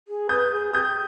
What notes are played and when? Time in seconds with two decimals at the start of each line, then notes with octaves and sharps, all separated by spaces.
0.08 G#4
0.29 B4 D#6 G6
0.52 G#4
0.73 G4 D#6 G6